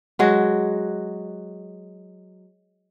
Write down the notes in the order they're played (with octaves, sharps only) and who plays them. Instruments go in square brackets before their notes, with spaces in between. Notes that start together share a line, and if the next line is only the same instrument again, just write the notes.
[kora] F#3 G#3 F#4